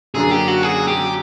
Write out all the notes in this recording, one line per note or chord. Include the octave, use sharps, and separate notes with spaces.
F#2 D3 F#3 A#3 D4 G#4
G4
F#4
G#4
G4